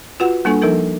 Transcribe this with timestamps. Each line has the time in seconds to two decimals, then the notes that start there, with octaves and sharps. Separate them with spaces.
0.20 F4 F#4 B4 F#5
0.45 G3 A#3 D4 A4 G#5 C#6
0.62 F3 A#3 D#4 A4 A#4